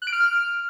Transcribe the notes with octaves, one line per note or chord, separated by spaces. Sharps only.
F#6
D7
F6